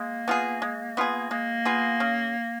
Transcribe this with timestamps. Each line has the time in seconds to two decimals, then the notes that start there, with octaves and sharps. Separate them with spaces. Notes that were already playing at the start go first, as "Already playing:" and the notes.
Already playing: G#3 A#3
0.28 B3 F4 G#4
0.62 G#3
0.97 B3 F4 G#4
1.31 G#3 A#3
1.65 B3 F4 G#4
2.00 C#3